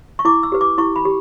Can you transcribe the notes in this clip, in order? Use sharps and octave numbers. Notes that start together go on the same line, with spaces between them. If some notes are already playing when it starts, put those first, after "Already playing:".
C#6
E4 D6
E6
G4 B4
D6
E4 C#6
B5
G4